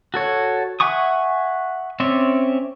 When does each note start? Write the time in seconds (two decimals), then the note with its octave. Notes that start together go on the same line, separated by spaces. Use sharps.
0.14 F#4 A4 C#5
0.80 E5 F#5 G#5 C#6 D#6
2.00 C4 C#4 C#5 D5 E5